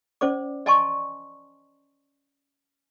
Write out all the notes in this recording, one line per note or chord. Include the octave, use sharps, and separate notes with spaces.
C#4 C5 D5 D6
D5 D#5 G#5 A5 C6 C#6